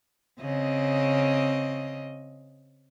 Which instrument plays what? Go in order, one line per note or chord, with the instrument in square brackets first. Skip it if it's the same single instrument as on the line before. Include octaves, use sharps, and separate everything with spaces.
[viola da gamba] C#3 C4 D#5